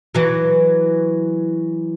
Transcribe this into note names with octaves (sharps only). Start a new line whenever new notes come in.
E3 F#3